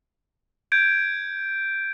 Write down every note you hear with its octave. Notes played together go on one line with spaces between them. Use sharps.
G6 G#6 D7